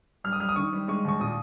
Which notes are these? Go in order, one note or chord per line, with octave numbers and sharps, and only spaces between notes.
G3 F6
D#6
G3 F6
D#6
D#3 C#6
G3
G#3 C#6
D#2 C#6
A#2 D#6